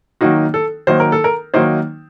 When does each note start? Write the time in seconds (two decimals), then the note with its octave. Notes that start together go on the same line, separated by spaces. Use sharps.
0.21 D#3 F#3 A#3 D#4 F#4
0.54 A4
0.87 D#3 F#3 A#3 D#4 C5
1.00 A#4
1.12 A4
1.24 A#4
1.54 D#3 F#3 A#3 D#4 C5